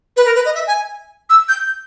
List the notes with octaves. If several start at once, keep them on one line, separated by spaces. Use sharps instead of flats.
B4
A#4
B4
D#5
E5
G#5
E6
G6